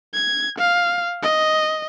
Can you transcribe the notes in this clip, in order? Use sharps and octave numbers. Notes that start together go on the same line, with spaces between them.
G#6
F5
D#5